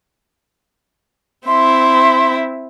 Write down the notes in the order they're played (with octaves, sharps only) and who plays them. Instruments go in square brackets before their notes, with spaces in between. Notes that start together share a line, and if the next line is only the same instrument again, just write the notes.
[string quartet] C4 E4 E5 [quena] C6